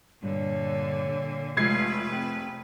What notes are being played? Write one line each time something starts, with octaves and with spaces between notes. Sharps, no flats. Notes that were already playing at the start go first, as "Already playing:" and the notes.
G2 A#2 D3 G3 C#5
F1 G#3 A3 F4 B4 G#6 C7
C4 G5